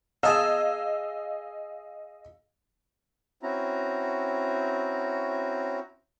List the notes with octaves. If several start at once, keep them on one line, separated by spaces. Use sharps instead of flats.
G#4 D#5 F5 A5 A#5 E6
C4 C#4 E4 F#4 A#5